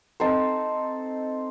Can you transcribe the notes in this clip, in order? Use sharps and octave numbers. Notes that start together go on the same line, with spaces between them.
C4 D#4 A4 C5